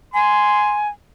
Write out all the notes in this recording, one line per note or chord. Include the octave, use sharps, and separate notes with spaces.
G#5 C6